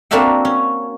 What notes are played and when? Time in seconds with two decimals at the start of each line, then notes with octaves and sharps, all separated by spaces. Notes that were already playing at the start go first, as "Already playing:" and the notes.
0.11 A#3 C4 D4 F#4 E5 G5
0.45 C#4